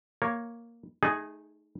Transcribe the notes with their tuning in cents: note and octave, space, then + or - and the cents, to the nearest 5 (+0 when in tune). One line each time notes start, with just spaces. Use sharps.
A#3 +0 C#5 +0
A3 -25 D#4 +0 G#4 +0